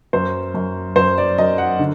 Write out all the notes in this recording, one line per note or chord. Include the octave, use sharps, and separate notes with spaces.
F#2 C5
F#2
F#2 C5
D5
F#2 D#5
F#5
D3